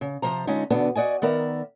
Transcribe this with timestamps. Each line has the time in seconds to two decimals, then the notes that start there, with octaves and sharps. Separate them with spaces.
0.01 C#3
0.22 C3 F3 C5 A#5
0.47 D3 G#3 C#4 D#4 F4
0.70 E2 B2 D3 B3 D4
0.95 F#4 D5 D#5 G#5
1.22 D#3 B3 A#4 D5 E5